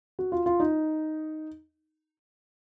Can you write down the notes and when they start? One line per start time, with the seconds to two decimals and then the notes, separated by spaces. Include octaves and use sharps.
0.19 F#4
0.32 F4
0.46 F4
0.60 D#4